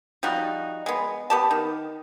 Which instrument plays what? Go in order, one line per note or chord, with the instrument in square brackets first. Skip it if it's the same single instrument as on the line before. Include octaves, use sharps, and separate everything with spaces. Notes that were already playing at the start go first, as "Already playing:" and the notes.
[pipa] F3 G3 D#4 F#4
G#3 B3
B3 G4 A5
D#3